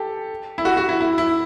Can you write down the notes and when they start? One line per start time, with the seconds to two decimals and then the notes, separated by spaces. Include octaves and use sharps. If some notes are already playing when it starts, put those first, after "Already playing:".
Already playing: G4 A4
0.58 E4
0.65 F#4
0.77 F#4
0.89 E4
1.01 E4
1.18 E4